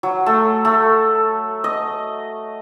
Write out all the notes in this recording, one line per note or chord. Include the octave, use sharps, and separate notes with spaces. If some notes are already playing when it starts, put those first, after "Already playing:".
F#3
A3
A3
D#5